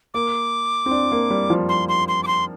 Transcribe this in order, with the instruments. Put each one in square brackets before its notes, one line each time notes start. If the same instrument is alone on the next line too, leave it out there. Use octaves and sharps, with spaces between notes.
[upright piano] A#3 [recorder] D6
[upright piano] C4
D4
A#3
G3
F3
[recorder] C6
C6
C6
D6
C6